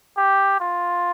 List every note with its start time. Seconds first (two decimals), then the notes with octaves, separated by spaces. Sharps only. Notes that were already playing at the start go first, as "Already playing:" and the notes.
0.17 G4
0.60 F4